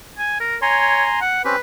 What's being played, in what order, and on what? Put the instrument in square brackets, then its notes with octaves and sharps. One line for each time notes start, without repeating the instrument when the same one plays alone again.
[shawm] G#5
A#4
[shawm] C#5 [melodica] G#5 A#5 C6
[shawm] F#5
[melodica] C4 C#4 G4 [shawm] B4